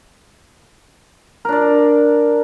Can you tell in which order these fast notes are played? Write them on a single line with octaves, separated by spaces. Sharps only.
A#4 D4 D5